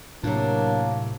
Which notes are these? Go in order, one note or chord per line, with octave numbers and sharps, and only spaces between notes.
A2 C3 F#3 A#3 D4